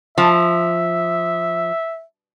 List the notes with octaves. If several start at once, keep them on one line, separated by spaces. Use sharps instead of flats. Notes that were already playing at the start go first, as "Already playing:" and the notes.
F3 E5